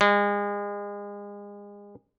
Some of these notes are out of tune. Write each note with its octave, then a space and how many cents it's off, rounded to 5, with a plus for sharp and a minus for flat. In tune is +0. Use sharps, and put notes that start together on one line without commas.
G#3 -35